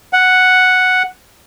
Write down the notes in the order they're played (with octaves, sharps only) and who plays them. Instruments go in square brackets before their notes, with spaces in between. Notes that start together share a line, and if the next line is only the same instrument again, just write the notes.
[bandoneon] F#5